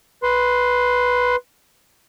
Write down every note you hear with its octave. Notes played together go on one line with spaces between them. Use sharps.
B4 C6